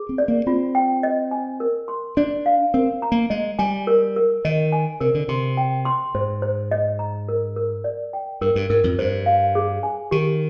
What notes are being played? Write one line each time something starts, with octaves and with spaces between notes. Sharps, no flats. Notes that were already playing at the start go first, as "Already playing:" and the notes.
Already playing: G#4
C4
D5
A#3
C4 F4
G5
D#5
G#5
A#4
C6
D4 D5
F5
C4 A#4
A#5
A#3
G#3 D#5
G3 G#5
A#4
A#4
D#3 D#5
G#5
C3 A#4
D3
C3 C6
G5
C6
G#2 C5
C5
D#5
A#5
A#4
A#4
D5
G5
G2 A#4
G2
G#2 A#4
F2
G2 C5
F5
G#4
G#5
D#3 G4